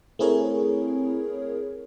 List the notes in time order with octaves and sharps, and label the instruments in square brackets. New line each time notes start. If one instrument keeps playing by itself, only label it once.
[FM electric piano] A3 C4 E4 G#4 A#4 C#5